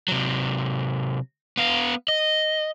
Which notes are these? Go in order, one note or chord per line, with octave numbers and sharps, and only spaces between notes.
C3 F#3
B3 F5
D#5